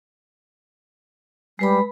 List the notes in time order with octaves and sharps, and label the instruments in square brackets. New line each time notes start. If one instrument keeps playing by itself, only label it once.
[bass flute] G3 [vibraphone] G#3 B4 B5